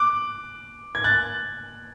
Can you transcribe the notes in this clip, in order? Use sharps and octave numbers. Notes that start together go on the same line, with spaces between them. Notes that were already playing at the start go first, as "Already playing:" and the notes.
Already playing: D6 F#6
G#6
F#6 A6